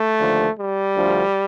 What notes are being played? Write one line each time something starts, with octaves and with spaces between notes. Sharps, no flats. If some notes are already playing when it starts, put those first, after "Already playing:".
Already playing: A3
D#2 D3 F3
G3
D2 D3 F3